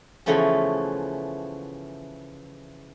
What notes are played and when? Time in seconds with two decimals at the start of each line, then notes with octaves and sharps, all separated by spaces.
0.26 C#3 E3 F3 A3 B3 C#4